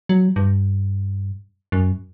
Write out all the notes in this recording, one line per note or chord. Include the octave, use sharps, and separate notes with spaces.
F#3
G2
F#2